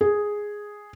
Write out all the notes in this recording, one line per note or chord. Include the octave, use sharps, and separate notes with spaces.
G#4